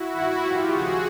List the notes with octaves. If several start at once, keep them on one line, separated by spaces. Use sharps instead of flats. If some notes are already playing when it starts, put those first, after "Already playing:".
Already playing: E4 F#4
G2 D#3
A2 F3 F4 G4
D#2 C#3 F3 F#4 G#4